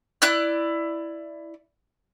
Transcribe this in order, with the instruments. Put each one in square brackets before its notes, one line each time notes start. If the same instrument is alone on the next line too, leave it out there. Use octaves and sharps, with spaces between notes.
[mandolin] E4 D5 F#6